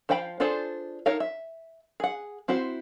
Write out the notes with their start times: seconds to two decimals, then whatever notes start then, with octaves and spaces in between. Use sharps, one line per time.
0.09 F3 C5 F5 G5 B5
0.40 D4 F4 G#4 A4 C5
1.06 D#4 A4 A#4 C#5 F5
1.20 E5
2.00 G#4 F#5
2.48 C4 E4 F#4 C5